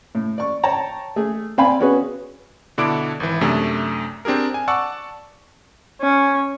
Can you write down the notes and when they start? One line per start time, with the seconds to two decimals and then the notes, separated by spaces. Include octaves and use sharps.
0.15 A2
0.38 D5 C#6
0.64 C#5 G5 A5 A#5
1.16 A3 G#4
1.58 C4 D5 F5 G5 G#5 B5
1.80 B3 C#4 F#4 G#4 B4
2.78 B2 D3 D4 E4 D6 D7
3.20 G#1 E3
3.41 F#2 C3 A3 C4 D4
4.25 C4 D4 G4 G#4 A#4
4.54 G#5
4.68 D5 F#5 A5 C#6 E6
6.01 C#4